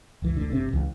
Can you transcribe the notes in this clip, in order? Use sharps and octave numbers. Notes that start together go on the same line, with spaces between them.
F#1 C#2 E3
D2 D3
G1 C3
C#2 E3